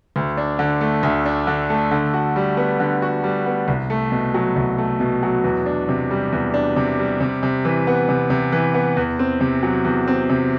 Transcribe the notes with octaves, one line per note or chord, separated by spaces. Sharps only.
D2
D4
D3
A3
D2
D4
D3
A3
D3
F#4
G3
B3
D3
F#4
G3
B3
C2
A3
B2
F#3
C2
A3
B2
F#3
E2
D4
C3
G3
E2
D4
C3
G3
C3
C3
E3
B3
C3
C3
E3
B3
E2
C4
C3
F#3
E2
C4
C3